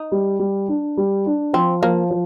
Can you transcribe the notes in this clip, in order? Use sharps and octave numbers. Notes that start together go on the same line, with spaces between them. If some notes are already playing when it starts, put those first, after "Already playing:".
Already playing: D#4
G3
G3
D4
G3
D4
F3 C4
F3 A#3
F3